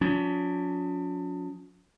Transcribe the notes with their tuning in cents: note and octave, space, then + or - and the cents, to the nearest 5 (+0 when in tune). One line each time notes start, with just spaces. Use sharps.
F3 +45 C#4 +45